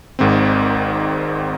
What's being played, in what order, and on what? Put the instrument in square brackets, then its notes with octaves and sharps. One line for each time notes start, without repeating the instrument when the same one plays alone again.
[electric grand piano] G#1 G#2 D#3 C4